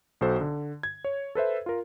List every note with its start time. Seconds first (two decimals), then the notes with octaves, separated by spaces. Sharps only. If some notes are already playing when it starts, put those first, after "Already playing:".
0.21 B1 F#4 A4 C5
0.41 D3
0.83 G#6
1.05 C#5
1.35 A4 B4 C5 E5
1.66 F4 A#4